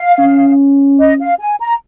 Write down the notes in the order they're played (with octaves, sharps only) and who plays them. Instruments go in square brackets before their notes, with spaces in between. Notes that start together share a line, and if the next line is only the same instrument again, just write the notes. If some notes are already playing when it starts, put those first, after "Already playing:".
Already playing: [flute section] F5
[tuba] C#4
[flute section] D#5
F5
G#5
A#5